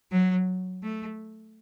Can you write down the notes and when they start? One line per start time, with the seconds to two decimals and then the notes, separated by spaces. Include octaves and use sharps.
0.12 F#3
0.83 A3